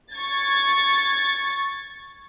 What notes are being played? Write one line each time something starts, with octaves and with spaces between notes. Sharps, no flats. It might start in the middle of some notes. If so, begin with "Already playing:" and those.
C#6 G#6 A6